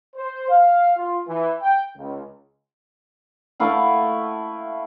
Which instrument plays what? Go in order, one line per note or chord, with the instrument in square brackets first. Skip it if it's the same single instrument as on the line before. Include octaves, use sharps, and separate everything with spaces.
[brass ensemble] C5
F5
F4
E3
G5
C#2
[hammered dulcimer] A3 E4 F5 F#5